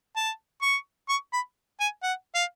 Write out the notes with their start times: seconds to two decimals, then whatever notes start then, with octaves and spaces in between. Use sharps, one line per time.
0.16 A5
0.62 C#6
1.09 C#6
1.33 B5
1.80 G#5
2.03 F#5
2.35 F5